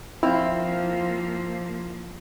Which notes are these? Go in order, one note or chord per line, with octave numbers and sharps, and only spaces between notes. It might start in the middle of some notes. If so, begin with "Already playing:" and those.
F3 A#3 C4 E4 F4